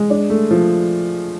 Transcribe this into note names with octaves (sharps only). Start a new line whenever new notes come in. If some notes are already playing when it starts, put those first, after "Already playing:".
Already playing: G#3
D4
A3
F3